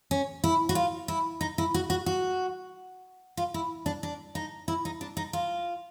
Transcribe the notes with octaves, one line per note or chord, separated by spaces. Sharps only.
C#4
E4
F#4
F4
E4
D#4
E4
F#4
F#4
F#4
F4
E4
D4
D4
D#4
E4
D#4
D4
D#4
F4